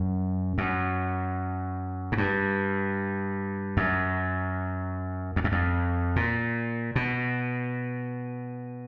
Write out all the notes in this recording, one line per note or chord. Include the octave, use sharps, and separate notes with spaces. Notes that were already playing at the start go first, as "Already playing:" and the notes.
Already playing: F#2
F#2
G#2
G2
F#2
F2
F#2
F2
A#2
B2